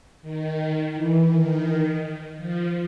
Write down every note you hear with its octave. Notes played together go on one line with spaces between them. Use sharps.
D#3
E3
D#3
F3